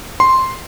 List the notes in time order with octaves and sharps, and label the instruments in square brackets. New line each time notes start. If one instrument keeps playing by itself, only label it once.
[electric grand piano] C6